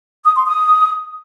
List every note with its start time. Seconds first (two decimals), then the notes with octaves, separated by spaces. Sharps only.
0.24 D#6
0.35 C6
0.46 D#6